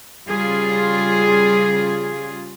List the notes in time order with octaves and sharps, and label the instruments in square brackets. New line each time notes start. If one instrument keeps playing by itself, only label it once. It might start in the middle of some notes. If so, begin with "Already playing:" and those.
[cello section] C#3 G3 F4 G#4